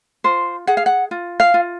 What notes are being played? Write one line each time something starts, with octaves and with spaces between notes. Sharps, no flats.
F4 C5
G#4 F#5
F5
F#5
F4
F5
F4